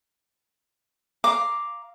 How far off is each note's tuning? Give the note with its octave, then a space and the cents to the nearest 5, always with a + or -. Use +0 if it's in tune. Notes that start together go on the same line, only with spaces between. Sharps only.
F5 +0 A#5 +0 D6 +0